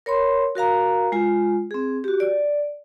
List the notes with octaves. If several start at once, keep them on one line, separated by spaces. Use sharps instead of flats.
A#4 C#5 B5 C6
F#4 A#4 F5 A#5
G#3 F4
C4 G#4
F#4 G4
D5